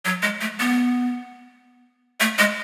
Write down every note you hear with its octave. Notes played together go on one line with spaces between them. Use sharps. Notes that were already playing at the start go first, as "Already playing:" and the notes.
F#3
G#3
A3
B3
A3
G#3